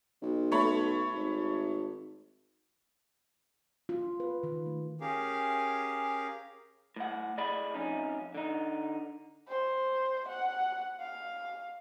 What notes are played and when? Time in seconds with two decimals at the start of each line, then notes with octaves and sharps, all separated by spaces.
0.22 B1
0.52 A3 C#5 B5
1.13 G#1
3.89 F4
4.20 B4
4.43 D#3
4.66 A3
5.01 C#4 G4 G#4 A#4 F5
6.96 A2 F#5
7.38 A2 G#4 D5 D#5 B5
7.74 F2 C#4 D#4
8.35 D3 D#4
9.48 C5
10.28 F#5
11.00 F5